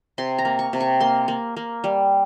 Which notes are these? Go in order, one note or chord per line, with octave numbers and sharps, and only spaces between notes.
C3 C6
A#5
A#3
C#6
C3
C#6
A#3 C6
A#3
A#3
G3